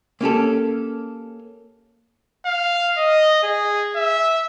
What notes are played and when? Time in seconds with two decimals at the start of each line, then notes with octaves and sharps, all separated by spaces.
0.21 A#3 C#4 G4 A4
2.46 F5
2.98 D#5
3.43 G#4
3.96 E5